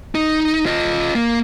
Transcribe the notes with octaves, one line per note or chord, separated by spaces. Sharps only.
D#4
F4 D#5
A#3